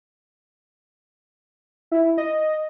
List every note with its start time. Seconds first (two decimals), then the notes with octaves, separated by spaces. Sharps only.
1.91 E4
2.18 D#5